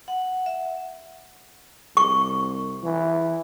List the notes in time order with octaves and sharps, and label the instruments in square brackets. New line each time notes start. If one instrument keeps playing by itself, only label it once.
[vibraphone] F#5
E5
[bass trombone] C2 [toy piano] C#6
[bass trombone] E3